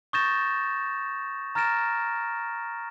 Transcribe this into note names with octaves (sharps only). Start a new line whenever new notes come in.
C#6 D#6 G6 A6 A#6 E7
A#5 F6 A6 A#6 D7 E7